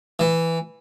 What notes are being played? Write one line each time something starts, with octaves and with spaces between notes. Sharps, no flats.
E3